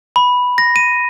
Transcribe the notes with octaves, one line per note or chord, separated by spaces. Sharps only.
B5
A#6
D#7